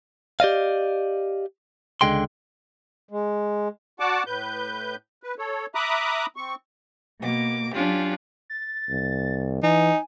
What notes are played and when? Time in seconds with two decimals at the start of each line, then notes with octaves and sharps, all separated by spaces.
0.40 G4 D5 D#5 F5
2.01 C#2 D3 G#3 G5 C6
3.09 G#3
4.00 F#4 D5 F#5 A5 D6
4.27 A2 B4 G6
5.23 B4
5.38 A4 C#5
5.75 E5 A#5 B5 D6 D#6 F#6
6.36 C4 C#6
7.22 B2 A#3 D6
7.74 F#3 C#4 D4 F4 G4
8.50 A6
8.90 C2
9.63 E3 D#4 G#5